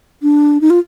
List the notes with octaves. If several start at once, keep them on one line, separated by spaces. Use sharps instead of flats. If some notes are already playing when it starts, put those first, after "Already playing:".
D4
D#4
F4